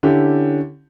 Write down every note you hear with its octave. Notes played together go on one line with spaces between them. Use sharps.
D3 C#4 E4 G4